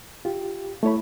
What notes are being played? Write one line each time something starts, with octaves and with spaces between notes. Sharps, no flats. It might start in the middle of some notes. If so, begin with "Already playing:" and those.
F4 G4
A3 E4 C#5 B5